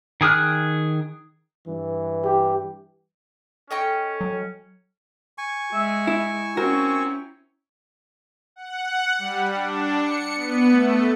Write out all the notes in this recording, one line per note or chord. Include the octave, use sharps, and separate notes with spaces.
D#3 G#4 D#6 F6 F#6
G2 E3
G4
C#4 A4 D#5 G5 C#6
F#3
G#5 C#6
G#3 E5
E4
C4 C#4 E4 F#4 A#4
F#5
G3
D4
C#7
B3
A3